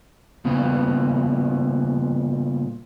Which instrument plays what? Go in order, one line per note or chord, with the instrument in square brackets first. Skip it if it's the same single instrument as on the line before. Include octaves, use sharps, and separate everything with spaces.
[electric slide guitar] A#2 C#3 G3 B3